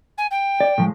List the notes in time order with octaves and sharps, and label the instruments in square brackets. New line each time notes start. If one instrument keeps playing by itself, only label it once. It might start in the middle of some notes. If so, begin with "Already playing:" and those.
[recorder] G#5
G5
[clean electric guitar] D5
A2 F3 G#3